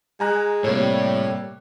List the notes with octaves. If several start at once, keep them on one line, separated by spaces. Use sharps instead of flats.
G#3 G#5 A#5 F#6
A2 C3 G3 A#3 A4 C#5